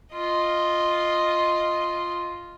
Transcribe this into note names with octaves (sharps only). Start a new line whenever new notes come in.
F4 D#5